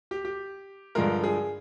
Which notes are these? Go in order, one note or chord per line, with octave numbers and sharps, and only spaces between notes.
G4
G4
G2 D3 F3 G#3 A#4
G#4